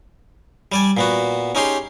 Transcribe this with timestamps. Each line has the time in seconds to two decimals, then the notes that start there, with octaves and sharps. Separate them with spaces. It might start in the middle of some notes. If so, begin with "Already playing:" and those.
0.72 G3 D5 G#5
0.97 A#2 B3 F#4
1.55 C#4 D#4 G4 G#4 C6